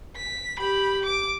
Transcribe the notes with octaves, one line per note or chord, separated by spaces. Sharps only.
B6
G4 B5
D6